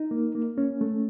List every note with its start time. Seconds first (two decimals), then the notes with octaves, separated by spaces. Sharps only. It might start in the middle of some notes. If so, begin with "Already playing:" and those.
Already playing: D#4
0.11 A#3
0.35 A#3
0.58 C#4
0.81 A3